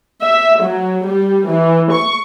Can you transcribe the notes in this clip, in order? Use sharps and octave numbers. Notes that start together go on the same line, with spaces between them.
E5
F#3
G3
E3
C#6